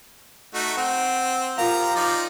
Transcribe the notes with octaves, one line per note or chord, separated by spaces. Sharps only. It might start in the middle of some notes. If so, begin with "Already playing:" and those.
A3 D#4 F#4
C4 F#5
F3 F4 G4 A#4 F5 A#5
F3 D#4 D5